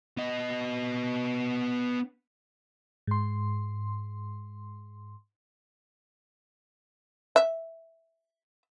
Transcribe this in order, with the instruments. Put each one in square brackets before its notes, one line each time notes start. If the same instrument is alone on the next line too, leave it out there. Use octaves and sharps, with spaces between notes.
[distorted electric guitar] B3 D#5
[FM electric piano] G#2 C6
[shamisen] E5